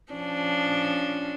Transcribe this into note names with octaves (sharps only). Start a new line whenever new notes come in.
F3 C#4 D4